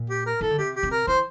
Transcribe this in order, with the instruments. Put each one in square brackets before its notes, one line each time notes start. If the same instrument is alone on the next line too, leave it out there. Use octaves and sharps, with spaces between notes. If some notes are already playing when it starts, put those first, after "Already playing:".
Already playing: [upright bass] A#2
[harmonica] G4
A#4
[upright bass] E3 [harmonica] A4
[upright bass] D3
[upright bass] C3 [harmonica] G4
[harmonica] G4
[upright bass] C3
[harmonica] A#4
[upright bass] E3 [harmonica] C5